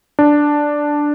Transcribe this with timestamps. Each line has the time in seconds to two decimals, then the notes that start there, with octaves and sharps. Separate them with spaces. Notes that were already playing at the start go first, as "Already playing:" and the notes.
0.19 D4